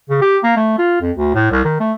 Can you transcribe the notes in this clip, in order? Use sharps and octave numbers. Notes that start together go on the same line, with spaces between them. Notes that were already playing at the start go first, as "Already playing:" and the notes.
C#3
G4
A#3
A3
F4
F2
D2
A2
C2
D#3
A3